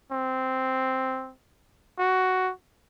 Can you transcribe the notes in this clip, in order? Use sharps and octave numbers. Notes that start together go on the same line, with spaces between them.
C4
F#4